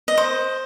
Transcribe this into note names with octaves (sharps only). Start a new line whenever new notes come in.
D#5
C5